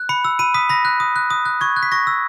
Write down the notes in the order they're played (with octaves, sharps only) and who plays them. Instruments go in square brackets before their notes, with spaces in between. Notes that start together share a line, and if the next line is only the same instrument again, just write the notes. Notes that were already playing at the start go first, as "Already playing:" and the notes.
Already playing: [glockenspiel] F#6
B5 C#7
E6
B5 D#7
D#6 B6
B5 A#6
F#6
D#6
F#6
D#6
F#6
C#6 G#6
F#6
B6
C#6 A#6
E6